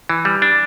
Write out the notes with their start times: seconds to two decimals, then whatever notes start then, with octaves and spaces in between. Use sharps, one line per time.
0.09 E3
0.25 G3
0.42 D4